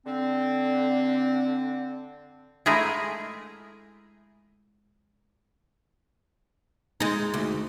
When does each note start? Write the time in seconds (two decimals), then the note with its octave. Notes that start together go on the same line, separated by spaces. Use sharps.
0.06 D3 C4
2.66 G#3 A3 E4 G#4 A#4
7.00 G#3 D#4
7.34 D2